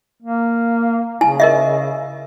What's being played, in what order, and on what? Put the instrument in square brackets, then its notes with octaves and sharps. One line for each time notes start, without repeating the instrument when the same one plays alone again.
[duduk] A#3
[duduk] C#3 [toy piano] E4 G#5
[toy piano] A#4 D#5 E5